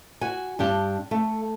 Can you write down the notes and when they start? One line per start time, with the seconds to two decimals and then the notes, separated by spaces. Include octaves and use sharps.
0.21 F#4 G#5
0.59 G2 D4 G4
1.11 A3